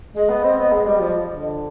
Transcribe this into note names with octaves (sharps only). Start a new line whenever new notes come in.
G#3 D#5
B3
C4
B3
G#3
G3
F3
D3